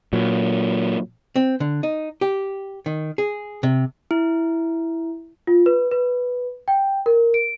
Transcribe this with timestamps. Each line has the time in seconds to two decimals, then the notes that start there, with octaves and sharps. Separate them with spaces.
0.13 A#2 F#3
1.36 C4
1.60 D3
1.83 D#4
2.21 G4
2.86 D#3
3.18 G#4
3.63 C3
4.11 E4
5.47 F4
5.66 B4
5.91 B4
6.68 G5
7.06 A#4
7.34 D7